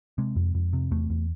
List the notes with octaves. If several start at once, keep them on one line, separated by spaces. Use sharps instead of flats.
C3 G#3
F2
F2
C3
E2 A3
E2